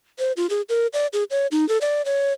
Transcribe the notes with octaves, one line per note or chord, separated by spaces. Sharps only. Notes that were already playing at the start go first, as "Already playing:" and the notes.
C5
F4
G#4
A#4
D5
G#4
C#5
D#4
A4
D5
C#5